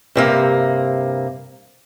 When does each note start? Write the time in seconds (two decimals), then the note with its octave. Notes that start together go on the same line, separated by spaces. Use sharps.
0.15 G2 C3 A#3